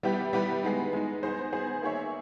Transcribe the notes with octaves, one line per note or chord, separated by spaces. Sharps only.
G3 B3 E4 G4 B4
G3 B3 E4 G4 B4
G#3 B3 D#4
G#3 B3 D#4
B3 D#4 G#4 C5
B3 D#4 G#4 C5
A#3 D#4 G#4 C#5 E5